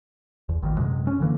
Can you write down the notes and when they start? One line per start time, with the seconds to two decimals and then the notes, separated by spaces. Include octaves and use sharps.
0.49 E2
0.62 A1 A#2 D#3
0.77 F#2 C3 G#3
1.07 C#4
1.20 D3 E3 A#3